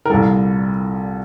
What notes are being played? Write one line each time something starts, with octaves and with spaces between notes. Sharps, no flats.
A#4
C2 A#2 G3 A4